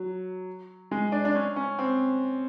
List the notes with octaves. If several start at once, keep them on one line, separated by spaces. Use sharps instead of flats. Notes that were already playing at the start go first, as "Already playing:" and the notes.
Already playing: F#3
G#3
D4
D4
C#4
C#4
C4